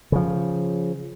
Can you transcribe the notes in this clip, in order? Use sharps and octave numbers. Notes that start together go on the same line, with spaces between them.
C#3 F3